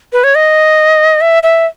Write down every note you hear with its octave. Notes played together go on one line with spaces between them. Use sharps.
B4
C#5
D#5
E5
E5